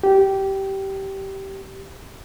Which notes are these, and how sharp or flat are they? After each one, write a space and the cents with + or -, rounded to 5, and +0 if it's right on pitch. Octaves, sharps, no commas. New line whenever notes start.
G4 -15